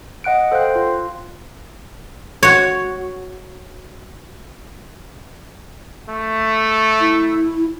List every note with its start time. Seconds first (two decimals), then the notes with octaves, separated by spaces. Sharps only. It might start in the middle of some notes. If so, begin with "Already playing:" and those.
0.24 D#5 F#5 F#6 D7
0.52 A4 C5 F5 G5 F#6
0.76 F4
2.43 F#4 C#5
6.09 A3
7.00 E4